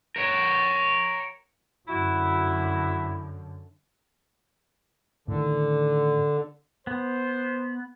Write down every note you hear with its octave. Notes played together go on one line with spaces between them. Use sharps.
A#4 C#5
F#2 D3 E4 F#4
A2 D3 D#3
B3 C5